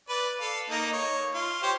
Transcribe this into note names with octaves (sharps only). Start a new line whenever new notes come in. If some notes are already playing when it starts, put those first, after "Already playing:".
B4 D5
A4 F5
A#3 D#4
C#5
F4
G4 C5 C#5